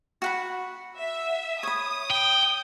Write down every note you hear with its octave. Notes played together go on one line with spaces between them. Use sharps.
F#4 F#5 B5
E5
C#5 B5 D#6
G5